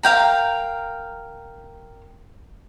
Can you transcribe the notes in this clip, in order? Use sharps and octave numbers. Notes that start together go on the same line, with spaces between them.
A#4 F5 G5 A#5